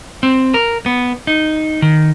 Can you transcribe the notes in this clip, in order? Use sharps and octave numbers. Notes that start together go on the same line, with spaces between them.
C4
A#4
B3
D#4
D#3